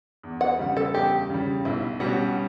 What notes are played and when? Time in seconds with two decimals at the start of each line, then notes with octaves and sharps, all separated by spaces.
0.23 E2
0.41 F#5
0.59 C#3 G3
0.77 A4
0.94 E2 G4
1.30 C#3 G3
1.65 B1 E4
2.00 B2 G3 C#4 F#4